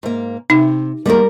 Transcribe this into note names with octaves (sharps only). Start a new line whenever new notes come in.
G#2 A#3
C3 D#4
D#3 G3 G#3 A#3 A#4